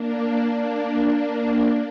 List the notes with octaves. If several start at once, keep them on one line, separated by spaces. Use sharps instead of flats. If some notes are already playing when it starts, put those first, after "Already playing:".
Already playing: A#3 D4
A#3 D4
A#3 D4